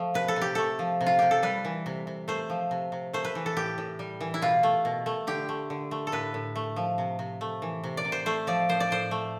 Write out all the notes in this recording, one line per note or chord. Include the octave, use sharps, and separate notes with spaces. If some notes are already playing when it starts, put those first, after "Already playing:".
Already playing: F3 A3
C3 B4
A4
C3
G4
A3 A4
F3
C3
F4
C3 G4
A4
G3 B4
E3
C3
C3
A3 C5
F3
C3
C3
A3 C5
B4
E3
A4
A2 G4
A2
G3
E3
E4
B2 F4
A3
B2
A3
D3 G4
A3
D3
A3
A4
A2 B4
A2
A3
F3
C3
C3
A3
E3
C3
D5
C3
C5
A3 C5
F3 D5
A2 C5
D5
A2 C5
A3